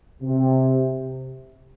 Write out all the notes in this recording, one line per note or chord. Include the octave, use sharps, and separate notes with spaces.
C3